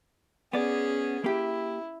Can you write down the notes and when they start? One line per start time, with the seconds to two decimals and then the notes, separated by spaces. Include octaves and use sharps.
0.53 B3 C#4 G#4 D5
1.24 A#3 E4 G4